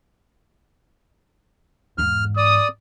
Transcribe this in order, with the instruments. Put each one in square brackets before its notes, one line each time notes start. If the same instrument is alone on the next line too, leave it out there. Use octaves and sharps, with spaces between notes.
[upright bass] E2 G#2 [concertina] F6
[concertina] D5 [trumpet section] D#6